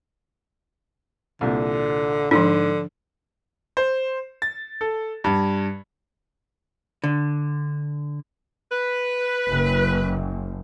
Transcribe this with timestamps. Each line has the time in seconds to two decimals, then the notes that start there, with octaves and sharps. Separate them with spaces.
1.41 C2 A#2 D3
2.31 G#2 D3 F3 D4
3.77 C5
4.42 A6
4.81 A4
5.24 G2
7.04 D3
8.70 B4
9.47 F#1